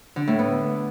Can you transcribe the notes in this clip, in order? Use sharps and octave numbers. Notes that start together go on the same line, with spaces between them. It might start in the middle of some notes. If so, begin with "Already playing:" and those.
D3
A2
B3